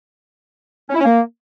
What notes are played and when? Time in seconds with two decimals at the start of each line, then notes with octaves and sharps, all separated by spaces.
0.89 C#4
0.95 E4
1.00 C#4
1.05 A#3